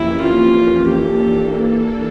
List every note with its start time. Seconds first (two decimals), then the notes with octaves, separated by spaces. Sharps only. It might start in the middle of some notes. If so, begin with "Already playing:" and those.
Already playing: F2 E3 A#3 C#4 E4 G4
0.21 F4
0.88 E3 A#3 D4 G4 A4